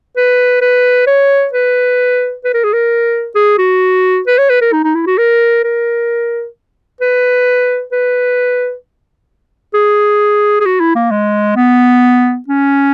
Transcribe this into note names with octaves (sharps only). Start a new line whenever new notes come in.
B4
B4
C#5
B4
B4
A#4
G#4
A#4
G#4
F#4
B4
C#5
B4
A#4
D#4
D#4
E4
F#4
A#4
A#4
B4
B4
G#4
G#4
F#4
E4
A#3
G#3
B3
C#4